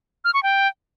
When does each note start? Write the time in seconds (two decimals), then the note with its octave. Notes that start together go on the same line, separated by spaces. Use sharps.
0.24 F6
0.34 C#6
0.43 G5